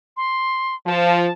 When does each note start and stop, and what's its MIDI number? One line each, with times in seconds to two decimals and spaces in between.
0.17 0.75 84
0.86 1.27 53
0.86 1.32 81